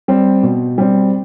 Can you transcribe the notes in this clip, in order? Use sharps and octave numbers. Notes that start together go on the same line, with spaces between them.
G3 C4
B2
G3 C4